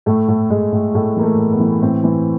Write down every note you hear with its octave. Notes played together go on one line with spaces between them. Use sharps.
A2 A3
A2
A2 G#3
A2
A2 A3
E3 A#3
A3
A2
B3
E3
A2 C4
E3